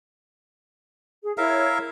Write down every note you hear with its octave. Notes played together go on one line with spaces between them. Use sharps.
G#4
E4 A#4 C#5 E5 F5